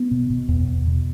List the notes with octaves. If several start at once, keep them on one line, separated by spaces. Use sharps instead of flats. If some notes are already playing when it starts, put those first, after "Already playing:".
Already playing: B3
B2
B2
E2
E2
B2